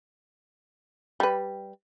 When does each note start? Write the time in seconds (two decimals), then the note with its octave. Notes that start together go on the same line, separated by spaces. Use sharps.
1.20 G3 B4